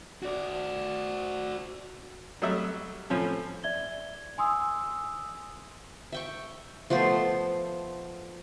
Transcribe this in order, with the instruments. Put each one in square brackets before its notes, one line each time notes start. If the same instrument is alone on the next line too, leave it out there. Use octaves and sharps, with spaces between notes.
[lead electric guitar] F#4 D5
[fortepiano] F#3 G3 A3 D#5 E5
A2 F3 C#4
[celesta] D5 E5 G#6 G7
G#5 C6 D#6 E6
[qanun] E5 G5 C#6
F3 A3 B3 C5